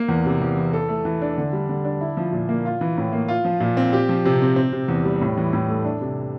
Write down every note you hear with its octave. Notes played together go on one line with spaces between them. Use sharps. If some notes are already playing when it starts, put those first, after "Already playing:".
Already playing: A#3
E2
C3
E2
E3
A4
A3
E3
D4
D3
G3
D3
D4
E4
F3
A#2
A#3
F4
E3
A2
A#3
F4
F3
A#2
C4
G4
F3
C3
C4
C4
C3
E2
G3
A2
E3
A2
A3
D4
C3